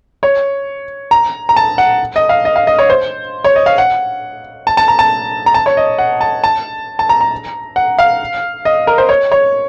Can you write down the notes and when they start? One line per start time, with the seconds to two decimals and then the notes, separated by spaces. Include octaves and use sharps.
0.23 C#5
1.11 A#5
1.49 A#5
1.56 A5
1.78 F#5
2.16 D#5
2.29 F5
2.45 D#5
2.56 F5
2.67 D#5
2.78 C#5
2.90 C5
3.44 C#5
3.56 D#5
3.66 F5
3.78 F#5
4.67 A5
4.77 A5
4.88 A#5
4.99 A5
5.46 A#5
5.54 A5
5.66 C#5
5.77 D#5
5.99 F#5
6.21 A5
6.44 A5
6.99 A5
7.09 A#5
7.21 A#5
7.76 F#5
7.99 F5
8.65 D#5
8.87 A#4
8.98 C5
9.09 C#5
9.32 C#5